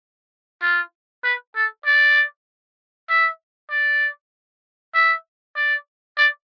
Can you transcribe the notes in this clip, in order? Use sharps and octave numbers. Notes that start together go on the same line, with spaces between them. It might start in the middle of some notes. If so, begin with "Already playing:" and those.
F4
B4
A4
D5
E5
D5
E5
D5
D5